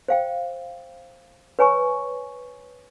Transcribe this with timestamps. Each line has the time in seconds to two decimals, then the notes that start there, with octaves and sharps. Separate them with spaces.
0.08 C5 F5 G5
1.59 B4 C#5 G#5 A#5 C#6